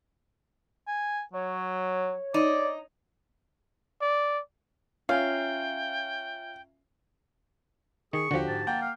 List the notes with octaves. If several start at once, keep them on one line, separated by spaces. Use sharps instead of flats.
G#5
F#3 C#5
D#4 D5
D5
C#4 F4 E5 F5 G5 G#5 A#5
D#3 G#4 C#6
D#2 D3 F3 F#4 G4
G#2 A5
A#3 F#5 G5 G6
F5